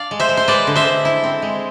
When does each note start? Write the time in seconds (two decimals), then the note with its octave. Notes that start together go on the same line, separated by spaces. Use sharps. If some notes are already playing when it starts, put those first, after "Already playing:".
Already playing: D4 D5 F5
0.11 G#3
0.20 C5 E5
0.29 G#3
0.37 C5
0.48 G#3 B4 D5
0.67 D3
0.76 C5 E5
0.85 D3
1.05 E4
1.24 C4
1.42 G#3